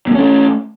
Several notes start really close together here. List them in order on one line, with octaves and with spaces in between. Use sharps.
C4 A#3 C#4 A3